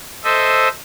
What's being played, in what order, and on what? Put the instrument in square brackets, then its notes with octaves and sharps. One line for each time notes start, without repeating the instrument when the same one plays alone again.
[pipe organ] A4 C5 D#5 E5